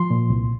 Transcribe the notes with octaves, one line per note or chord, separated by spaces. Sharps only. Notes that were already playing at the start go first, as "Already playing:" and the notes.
Already playing: F3 C6
A#2
C2